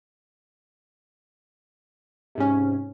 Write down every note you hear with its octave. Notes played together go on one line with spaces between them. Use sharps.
G#2 C3 C#4